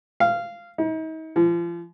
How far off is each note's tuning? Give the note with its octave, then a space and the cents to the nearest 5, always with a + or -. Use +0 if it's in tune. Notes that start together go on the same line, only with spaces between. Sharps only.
F5 -15
D#4 +40
F3 -35